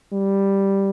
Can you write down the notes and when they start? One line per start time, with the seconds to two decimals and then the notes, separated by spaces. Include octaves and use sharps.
0.13 G3